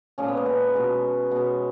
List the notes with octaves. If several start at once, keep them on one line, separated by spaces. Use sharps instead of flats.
A#2 F3 G#3 C#4
B3
A#3
B3
B2 G#3
B2 G#3 B3